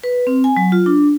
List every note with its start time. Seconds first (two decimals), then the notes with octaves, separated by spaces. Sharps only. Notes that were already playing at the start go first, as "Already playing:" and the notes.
0.04 B4
0.27 C4
0.44 G#5
0.57 F#3
0.72 F4
0.86 D4